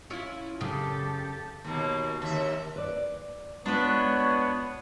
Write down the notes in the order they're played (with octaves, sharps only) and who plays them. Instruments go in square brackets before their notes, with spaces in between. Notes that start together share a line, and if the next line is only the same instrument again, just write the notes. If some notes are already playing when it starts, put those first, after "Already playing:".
[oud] C#4 E4 F4
[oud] F#2 C#3 [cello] G4 A4
[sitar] D#2 B2 A#3
D#2 E5
[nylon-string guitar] B4 D5
[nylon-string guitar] G#3 F4 [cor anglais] B3 [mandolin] D4 B4 [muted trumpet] C#5